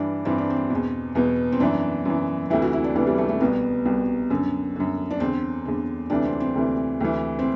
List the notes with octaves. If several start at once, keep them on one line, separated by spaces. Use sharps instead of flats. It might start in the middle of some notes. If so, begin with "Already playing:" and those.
Already playing: G2 E3 D4
G2 E3 C4
D4
C4
E2 B2
E2 B2 B3
C4
F#2 E3 D4
F#2 E3
D2 C3 E3 E4
F#4
E4
D4
D2 C3 E3 B3
G3
A3
A3
C2 B2 B3
C2 B2
F#2 D3
F#2 D3
D4
E2 D3 C4
E2 D3
D2 C3 E3 D4
C4
C4
D2 C3 E3
D2 C3 E3
C4